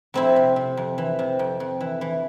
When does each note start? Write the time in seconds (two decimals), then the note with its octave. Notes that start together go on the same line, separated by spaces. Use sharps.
0.14 F2 C4 E4
0.36 C3
0.56 C3
0.77 F2
0.98 E3
1.19 C3
1.39 F2
1.60 F2
1.81 E3
2.01 E3